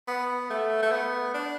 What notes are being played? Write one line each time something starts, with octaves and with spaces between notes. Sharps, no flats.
B3
A3
A3
B3
D4